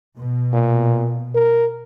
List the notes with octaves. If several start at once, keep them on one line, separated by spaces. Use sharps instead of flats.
B2
A#2
A#4